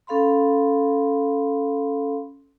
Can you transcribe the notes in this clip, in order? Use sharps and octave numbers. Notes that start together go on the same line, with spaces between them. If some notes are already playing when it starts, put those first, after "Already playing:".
C#4 A4 F5 B5 C6